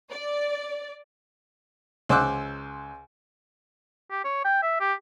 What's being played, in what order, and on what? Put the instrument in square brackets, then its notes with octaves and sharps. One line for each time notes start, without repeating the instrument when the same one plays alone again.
[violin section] D5
[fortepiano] C#2 C5 D6 E6 F#6
[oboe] G4
C#5
G5
E5
G4